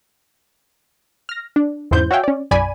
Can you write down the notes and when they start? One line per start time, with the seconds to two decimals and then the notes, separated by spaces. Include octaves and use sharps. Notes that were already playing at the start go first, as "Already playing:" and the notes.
1.29 F6 A#6
1.56 D4
1.91 E2 G#2 C#3 E4 C5 G6
2.11 F#4 C#5 E5 F5 G5 G#5
2.23 C#4 D5
2.51 B1 F#2 D5 G#5 B5 D#7